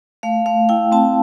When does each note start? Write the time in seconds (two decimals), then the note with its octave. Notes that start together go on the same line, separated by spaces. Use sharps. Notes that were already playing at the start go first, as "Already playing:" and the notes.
0.23 A3 F5
0.46 A3 F5
0.69 E4 G5
0.92 C4 A5